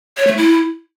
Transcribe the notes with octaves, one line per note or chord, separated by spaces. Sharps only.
C#5
A3
E4